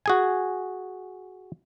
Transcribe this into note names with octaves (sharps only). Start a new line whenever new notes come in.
F#4 G#4 G#5